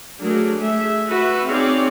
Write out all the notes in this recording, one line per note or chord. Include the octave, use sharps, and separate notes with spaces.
F#3 A3 D4 G#4 A#4
A3 G#4 E5
F#4 B4 E5
C4 D#4 G#4 C#5 D5 F5